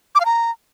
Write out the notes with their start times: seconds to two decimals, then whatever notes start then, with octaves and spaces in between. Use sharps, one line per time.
0.15 D6
0.20 F5
0.25 A#5